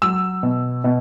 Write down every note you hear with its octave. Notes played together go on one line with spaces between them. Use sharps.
F#3 E6
B2
B2